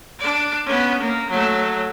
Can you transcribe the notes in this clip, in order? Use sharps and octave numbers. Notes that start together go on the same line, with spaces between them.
D4 D5
B3 C#4
A#3
F#3 A3